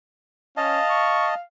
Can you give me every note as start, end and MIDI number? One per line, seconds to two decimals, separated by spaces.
0.57 0.79 61
0.57 1.35 75
0.57 1.40 77
0.57 1.35 81
0.90 1.30 85